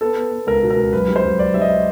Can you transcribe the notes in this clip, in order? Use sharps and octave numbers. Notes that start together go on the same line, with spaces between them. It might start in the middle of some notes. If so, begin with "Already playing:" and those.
B3 A4
B3
B3
C#2 A#4
B2
A#4
C#2
F#2 B4
G3
C5
F#2
F#2 D5
G3 E5
D#5